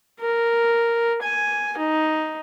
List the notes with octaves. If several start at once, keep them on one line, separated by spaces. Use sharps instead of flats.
A#4
G#5
D#4